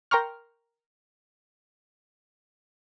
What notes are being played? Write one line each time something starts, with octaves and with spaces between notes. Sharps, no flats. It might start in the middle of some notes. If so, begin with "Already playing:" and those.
A#4 G5 A#5 C6 C#6 F6